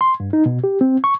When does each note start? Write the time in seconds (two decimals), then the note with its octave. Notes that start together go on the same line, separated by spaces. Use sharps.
0.01 C6
0.20 G2
0.33 D#4
0.46 B2
0.64 G4
0.81 C4
1.04 C#6